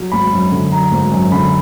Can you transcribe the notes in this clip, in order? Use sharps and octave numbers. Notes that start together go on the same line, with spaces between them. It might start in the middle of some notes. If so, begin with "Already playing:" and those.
Already playing: F#3
G#1 B5
F#2
D3
F#3 A#5
G#1
F#2
D3 B5